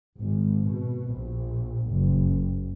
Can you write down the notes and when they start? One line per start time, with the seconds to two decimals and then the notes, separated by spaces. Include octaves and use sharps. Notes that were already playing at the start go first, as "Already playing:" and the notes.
0.19 G#1
0.69 B2
1.13 A#1
1.91 F#1